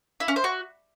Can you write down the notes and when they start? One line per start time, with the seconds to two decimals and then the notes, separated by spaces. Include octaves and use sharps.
0.20 E4
0.28 C#4
0.36 C5
0.44 F#4